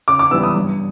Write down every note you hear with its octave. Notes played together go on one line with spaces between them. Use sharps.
C#3 D6
D6
E3 G3 B3 E6
D#6
G2